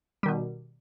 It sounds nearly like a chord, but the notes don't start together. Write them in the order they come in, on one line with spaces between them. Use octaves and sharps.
G3 D#3 B2